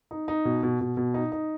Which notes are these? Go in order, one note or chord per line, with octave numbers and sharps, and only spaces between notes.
D#4
D#4
B2
B2
B2
B2
D#4
D#4